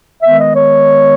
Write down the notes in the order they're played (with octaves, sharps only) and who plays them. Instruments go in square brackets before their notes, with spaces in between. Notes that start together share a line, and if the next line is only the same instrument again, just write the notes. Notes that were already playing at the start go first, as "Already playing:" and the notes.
[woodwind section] D#3 G#3 B3 E5
D#5
C#5